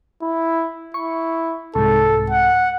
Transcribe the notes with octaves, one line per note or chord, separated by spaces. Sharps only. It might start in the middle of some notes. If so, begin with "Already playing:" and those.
E4
E4 C#6
C2 G#2 A4
F#5